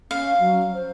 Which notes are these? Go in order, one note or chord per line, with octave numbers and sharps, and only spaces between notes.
C#4 F5
F#3
C5